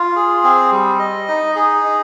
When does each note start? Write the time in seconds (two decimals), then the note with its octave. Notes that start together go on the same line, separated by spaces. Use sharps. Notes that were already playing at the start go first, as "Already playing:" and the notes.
Already playing: F4
0.16 G#4
0.44 C4
0.72 G3
0.99 D#5
1.28 D#4
1.56 G#4
1.84 D#4